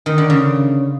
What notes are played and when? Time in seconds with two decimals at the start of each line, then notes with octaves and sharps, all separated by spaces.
0.06 D#3
0.18 D3
0.30 C#3